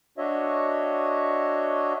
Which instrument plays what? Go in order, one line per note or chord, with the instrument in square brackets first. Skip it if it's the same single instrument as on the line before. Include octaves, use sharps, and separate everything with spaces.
[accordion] D4 F#4 C#5 D#5 E5